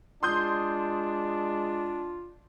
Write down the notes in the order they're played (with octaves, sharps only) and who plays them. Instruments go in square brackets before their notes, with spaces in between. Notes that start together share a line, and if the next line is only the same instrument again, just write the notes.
[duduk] G#3 [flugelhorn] D4 [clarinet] F4 [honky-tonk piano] C6 D#6 G6